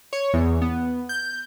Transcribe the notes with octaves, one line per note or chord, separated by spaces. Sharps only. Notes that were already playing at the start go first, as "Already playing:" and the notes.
C#5
E2
B3
G6